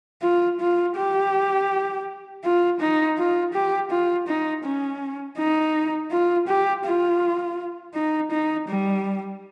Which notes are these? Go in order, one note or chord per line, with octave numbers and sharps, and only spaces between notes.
F4
F4
G4
F4
D#4
F4
G4
F4
D#4
C#4
D#4
F4
G4
F4
D#4
D#4
G3